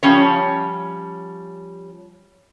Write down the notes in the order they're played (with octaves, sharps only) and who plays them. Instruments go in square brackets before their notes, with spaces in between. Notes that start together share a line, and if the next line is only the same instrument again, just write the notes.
[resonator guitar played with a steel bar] F3 G3 C#4 C#5